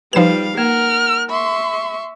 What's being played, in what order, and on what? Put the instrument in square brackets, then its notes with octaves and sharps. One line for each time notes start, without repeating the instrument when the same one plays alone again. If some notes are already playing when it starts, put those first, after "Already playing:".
[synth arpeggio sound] F3 E7 [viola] G3 F5 [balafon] D#4 B4
[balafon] A#3 [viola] A#4 F#5 [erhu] F6
[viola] E5 C#6 [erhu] C6